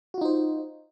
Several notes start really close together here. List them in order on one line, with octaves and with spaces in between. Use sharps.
F#4 F4 D#4 C5